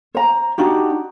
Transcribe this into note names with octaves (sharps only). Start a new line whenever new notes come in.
C5 A#5
D4 D#4 F#4 G4